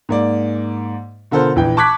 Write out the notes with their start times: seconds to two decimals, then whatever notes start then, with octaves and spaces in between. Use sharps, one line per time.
0.09 G#2 A#3 D5
1.31 B2 D3 F4 A4 A#4 C5
1.56 A#1 E3 G5
1.77 A5 C#6 D6 F#6 G#6 B6